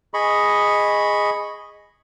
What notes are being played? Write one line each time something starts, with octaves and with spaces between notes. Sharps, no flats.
G#4 D#5 B5 C#6